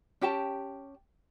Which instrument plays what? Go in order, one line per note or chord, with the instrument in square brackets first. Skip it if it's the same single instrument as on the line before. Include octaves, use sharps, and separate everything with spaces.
[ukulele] C#4 G4 G5 A5